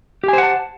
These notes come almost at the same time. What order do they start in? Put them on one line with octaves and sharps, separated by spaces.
G4 G#5 C5 F#5 A5